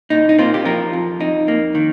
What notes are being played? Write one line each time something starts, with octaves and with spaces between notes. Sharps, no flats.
A#2 D#4
D#4
A#3 C4 F4
G4
F3 F4 A#4
F2
F2 D#4
A#3
D#3